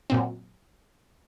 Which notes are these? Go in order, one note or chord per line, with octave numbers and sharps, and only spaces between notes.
F#2 A#2 C4